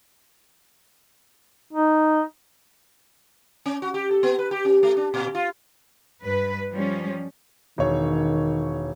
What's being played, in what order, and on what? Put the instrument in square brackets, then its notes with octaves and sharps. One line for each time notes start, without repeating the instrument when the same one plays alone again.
[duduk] D#4
[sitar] C#4
F#4
G4
A4
B3
B4
G4
C#4
A3
D4
A#2
F4
[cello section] G2 B4
F3 G3 C#4
[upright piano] E1 C#5 [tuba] D#3